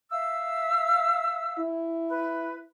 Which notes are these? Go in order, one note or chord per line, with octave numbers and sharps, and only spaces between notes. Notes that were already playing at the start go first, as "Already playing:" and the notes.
E5 F5 E6
E4
B4